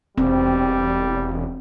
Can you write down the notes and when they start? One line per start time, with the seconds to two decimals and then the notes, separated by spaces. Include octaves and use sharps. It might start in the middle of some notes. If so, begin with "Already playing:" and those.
0.18 E1 G3 C4